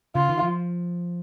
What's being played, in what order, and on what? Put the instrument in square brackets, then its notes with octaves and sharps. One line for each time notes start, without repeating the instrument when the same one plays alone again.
[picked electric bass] C#3 [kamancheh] F4
[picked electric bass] D#3
F3